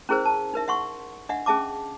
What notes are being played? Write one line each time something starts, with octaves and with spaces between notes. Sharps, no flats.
C#4 E4 G#4 A#4 C5
A5
D#4 A#4 E5
E5 F#5 C6 C#6
D4 D#5 E5 F#5
C#4 G#4 E5 A5 D6